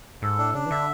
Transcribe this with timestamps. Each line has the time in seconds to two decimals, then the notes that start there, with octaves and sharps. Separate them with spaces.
0.22 G#2 A4
0.38 A2 D4
0.54 C#3 D4
0.66 E3
0.71 D3 E5